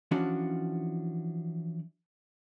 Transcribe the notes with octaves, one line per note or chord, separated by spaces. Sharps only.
E3 F3 C#4 D4 F#4